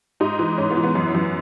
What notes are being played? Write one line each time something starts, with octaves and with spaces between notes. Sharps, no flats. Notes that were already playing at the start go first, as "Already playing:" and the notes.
G#2 D#4
E3
G#2 C#4
B3
E3
B3
F#2
F#2